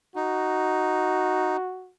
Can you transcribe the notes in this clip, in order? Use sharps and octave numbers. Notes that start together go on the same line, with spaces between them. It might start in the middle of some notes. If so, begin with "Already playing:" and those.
D#4 F#4